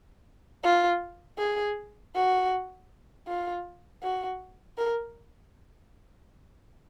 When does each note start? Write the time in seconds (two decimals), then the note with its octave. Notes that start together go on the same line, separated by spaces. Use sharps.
0.64 F4
1.39 G#4
2.15 F#4
3.28 F4
4.03 F#4
4.78 A#4